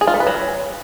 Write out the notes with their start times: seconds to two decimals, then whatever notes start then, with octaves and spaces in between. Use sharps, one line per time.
0.01 G#4
0.07 F4
0.14 A3
0.20 B4
0.27 F#3